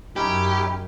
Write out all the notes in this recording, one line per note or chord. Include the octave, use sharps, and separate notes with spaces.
F#2 C#4 D#4 E4 G4